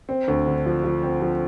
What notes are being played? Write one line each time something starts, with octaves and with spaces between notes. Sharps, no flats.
C4
D2
D3
F3
F3
C4
F3